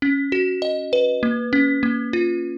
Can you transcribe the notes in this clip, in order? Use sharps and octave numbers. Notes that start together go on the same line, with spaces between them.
C#4
F#4
D#5
B4
A#3
C#4
A#3
F4